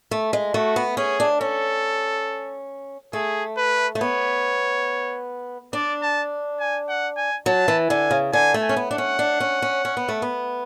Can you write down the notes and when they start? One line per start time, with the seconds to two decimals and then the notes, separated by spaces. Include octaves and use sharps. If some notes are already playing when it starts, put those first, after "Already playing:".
0.11 A3
0.33 G#3
0.54 A3 F#4
0.76 B3
0.97 C#4 G#4
1.20 D4
1.41 C#4 A4
3.13 A3 G#4
3.57 B4
3.95 A3
4.00 B3 C#5
5.73 D4 D5
6.02 A5
6.60 G#5
6.89 F#5
7.17 G#5
7.46 F#3 A5
7.68 E3
7.90 D3 G#5
8.11 C#3
8.33 D3 G#5
8.54 A3
8.62 G#5
8.69 C#4
8.76 B3
8.90 D4 F#5
8.98 C#4
9.19 D4
9.40 C#4
9.62 C#4
9.85 C#4
9.97 B3
10.09 A3
10.22 B3